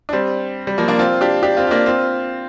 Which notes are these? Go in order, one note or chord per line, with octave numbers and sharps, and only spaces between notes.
D4
G3 C4
G3
F3 A#3
A#3 D4
C4 F4
D4 G4
D4 G4
C4 F4
F4
A#3 D4
C4 F4